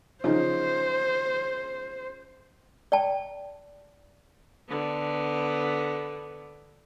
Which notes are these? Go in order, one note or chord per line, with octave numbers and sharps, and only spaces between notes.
C#3 F3 D#4 C5
D5 G5 A5
D3 B3